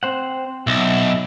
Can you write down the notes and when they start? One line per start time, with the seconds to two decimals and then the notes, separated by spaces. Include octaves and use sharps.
0.03 C4 C5 F#5
0.67 B1 E5